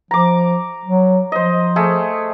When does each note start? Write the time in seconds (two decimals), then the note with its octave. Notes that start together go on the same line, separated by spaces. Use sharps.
0.11 F3 A#5 D6
0.86 F#3
1.32 F3 C5 D#5
1.76 A3 G#4